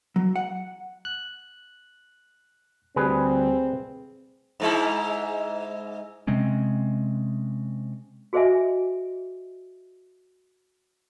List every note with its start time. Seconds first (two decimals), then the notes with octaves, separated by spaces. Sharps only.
0.16 F#3
0.36 F#5
1.05 F#6
2.96 D2 G3 C4 G#4 B4
4.60 G#2 G#3 E4
6.27 C3 G#3 C4 C#4
8.33 F#4 G#4 C5 D#5 E5 G#5